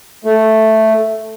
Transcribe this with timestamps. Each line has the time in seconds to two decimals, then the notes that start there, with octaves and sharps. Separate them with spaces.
0.25 A3